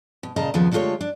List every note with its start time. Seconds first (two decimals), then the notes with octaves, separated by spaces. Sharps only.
0.23 B2
0.36 A#2 C#3 D#5 A5 A#5
0.54 D#2 C#3 F3 B3
0.71 D3 G#3 A3 F4 G4 C#5
1.01 D4